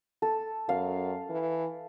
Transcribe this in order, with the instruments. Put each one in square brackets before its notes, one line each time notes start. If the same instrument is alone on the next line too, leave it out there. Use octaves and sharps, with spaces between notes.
[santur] A4
[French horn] F#2 [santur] F5
[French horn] E3